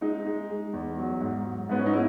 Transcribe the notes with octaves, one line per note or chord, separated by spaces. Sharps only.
G#3 D#4
G#3
G#3
E2
F#3
G#2
F#3
G#2 B3
C#4
D#4
G#3 E4